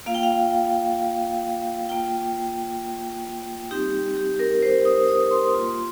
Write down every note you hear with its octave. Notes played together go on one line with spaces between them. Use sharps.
A#3 F4 F5
G5
F5
A#3 F4 G5
G3 C4 D#4 G4
G4
A#4
C5
D#6
D#6
D#6
C6
A#3 F4